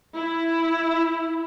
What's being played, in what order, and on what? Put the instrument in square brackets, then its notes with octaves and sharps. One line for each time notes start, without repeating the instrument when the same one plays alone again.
[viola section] E4